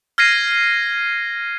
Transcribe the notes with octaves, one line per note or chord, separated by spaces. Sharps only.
F6 G#6 A#6 C7 D#7